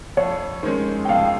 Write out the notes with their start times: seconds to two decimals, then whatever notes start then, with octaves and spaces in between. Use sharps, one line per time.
0.17 F2 C#5
0.63 D#3 G#3 C#4 C5
1.05 G5
1.09 F2 F5